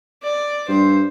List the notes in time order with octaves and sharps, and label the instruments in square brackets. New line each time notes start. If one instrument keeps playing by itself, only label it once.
[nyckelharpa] D5
[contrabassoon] G2 [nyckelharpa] C5